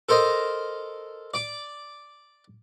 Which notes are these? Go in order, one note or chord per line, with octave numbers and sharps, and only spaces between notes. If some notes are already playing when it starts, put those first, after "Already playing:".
A4 A#4 C5 D#5
D5 D6